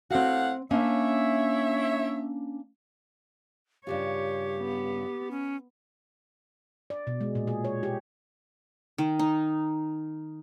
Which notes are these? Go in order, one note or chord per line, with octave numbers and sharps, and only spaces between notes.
A2 C4 F#4 F5 F#5
A#3 C#4 D4 E4 C#5 E5
G2 C#3 F4 G4 C#5
B3
C#4
D5
B2
G#3
A#2
G#4
C#5
G4
D#3
D#4